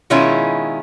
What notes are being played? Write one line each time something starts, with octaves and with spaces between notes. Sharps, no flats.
B2 D#3 G#3 C#4 E4 F4